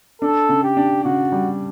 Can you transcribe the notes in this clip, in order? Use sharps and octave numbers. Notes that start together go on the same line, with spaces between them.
D4 A4
C#3
G4
D4
C#3 F#4
G3